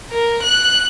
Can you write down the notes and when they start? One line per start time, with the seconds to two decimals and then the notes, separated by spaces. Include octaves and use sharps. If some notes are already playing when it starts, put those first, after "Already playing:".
0.11 A#4
0.43 F#6